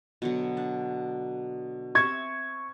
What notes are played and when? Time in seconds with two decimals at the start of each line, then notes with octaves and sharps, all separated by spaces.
0.22 B2 D3 F#3
0.57 D4
1.95 C4 E5 C#6 G#6